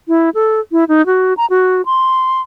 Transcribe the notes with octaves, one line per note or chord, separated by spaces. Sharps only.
E4
A4
E4
D#4
F#4
A#5
F#4
C6